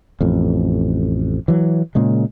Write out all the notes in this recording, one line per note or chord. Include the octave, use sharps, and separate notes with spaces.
A1 F2
E3 F#3
A#2 C#3 G#3